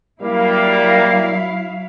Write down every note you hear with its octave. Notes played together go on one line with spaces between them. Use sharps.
F#3 G3 A#3 E4 F5